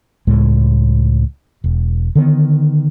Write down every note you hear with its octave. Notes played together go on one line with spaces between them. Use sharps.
C#2 A2 G#3
E1
D3 D#3 B3